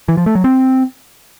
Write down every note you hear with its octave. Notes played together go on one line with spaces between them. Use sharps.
E3
F3
A3
F#3
C4